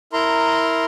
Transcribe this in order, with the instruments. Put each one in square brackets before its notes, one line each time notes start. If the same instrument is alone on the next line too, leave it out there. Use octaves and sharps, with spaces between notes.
[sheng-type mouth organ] E4 A#4 A#5 C6